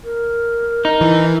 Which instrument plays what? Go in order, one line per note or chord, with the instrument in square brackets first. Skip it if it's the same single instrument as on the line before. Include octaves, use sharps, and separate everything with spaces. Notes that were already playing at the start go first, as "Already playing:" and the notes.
[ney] A#4
[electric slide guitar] D#4
[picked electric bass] E3